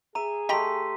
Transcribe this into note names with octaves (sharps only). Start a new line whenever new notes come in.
G#4 E5 A#5 D#7
A3 G4 D#5 G5 A#5 C6 B6